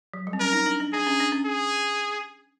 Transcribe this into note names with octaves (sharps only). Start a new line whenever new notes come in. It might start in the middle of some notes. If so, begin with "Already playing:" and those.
F#3
G3
C4
C#4 A#4
D#4
D4
D4
D4 G#4
C#4
D4
C#4
G#4